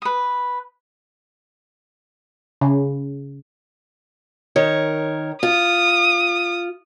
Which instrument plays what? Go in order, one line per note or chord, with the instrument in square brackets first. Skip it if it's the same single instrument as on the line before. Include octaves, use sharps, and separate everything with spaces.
[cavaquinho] B4 D#6
[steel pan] C#3
[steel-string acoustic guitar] D#3 A#4 C#5
[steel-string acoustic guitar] F4 [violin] D#6